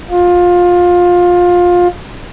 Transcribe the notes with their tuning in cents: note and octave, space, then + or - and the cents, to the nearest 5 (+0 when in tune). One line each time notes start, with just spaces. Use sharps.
F4 +20